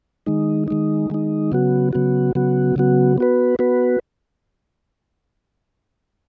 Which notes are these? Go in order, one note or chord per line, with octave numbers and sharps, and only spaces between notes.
D#3 G#3 D#4
D#3 G#3 D#4
D#3 G#3 D#4
C#3 F#3 B3 F#4
C#3 F#3 B3 F#4
C#3 F#3 B3 F#4
C#3 F#3 B3 F#4
B3 F#4 B4
B3 F#4 B4